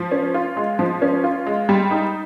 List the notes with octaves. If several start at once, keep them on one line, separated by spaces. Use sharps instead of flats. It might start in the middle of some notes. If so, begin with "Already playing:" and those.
Already playing: F3
C#4
F4
G#3
F3
C#4
F4
G#3
G3
D#4